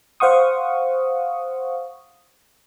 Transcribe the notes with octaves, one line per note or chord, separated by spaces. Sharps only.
C5 F5 F#5 C#6 D#6